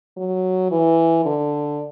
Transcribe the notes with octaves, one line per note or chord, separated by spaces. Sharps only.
F#3
E3
D3